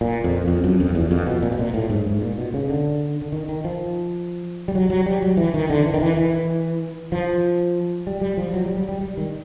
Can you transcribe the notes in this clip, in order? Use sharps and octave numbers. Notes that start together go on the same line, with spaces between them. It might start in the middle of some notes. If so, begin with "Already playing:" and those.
A#2
F2
F2
F#2
F2
E2
F2
B2
A#2
B2
A#2
A2
G#2
G#2
A#2
B2
C#3
D3
D3
D#3
D#3
F3
G3
F#3
F#3
G3
F#3
E3
D#3
D3
E3
D#3
E3
E3
F3
G3
G3
F3
F#3
G3
G3
G3
G3
D#3